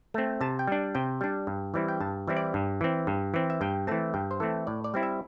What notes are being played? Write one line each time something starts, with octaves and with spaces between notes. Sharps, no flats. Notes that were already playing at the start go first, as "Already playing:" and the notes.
A3 C4
C3 A5
G5
G3 D4
C3 G5
G3 D4
G2
E3 G3 C4 E4
G5
G2 A5
E3 G3 C4 E4
D5
G2
E3 C4
G2
E3 C4
E5
G2 G5
E3 A3 C4 A5
G2 G5
C5
E3 A3 C4 A4
A2 D5
D5
G3 C4 E4
E5